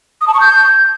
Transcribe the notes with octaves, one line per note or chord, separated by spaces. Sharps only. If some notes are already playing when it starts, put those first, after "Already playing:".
D#6
A5
C#6
G6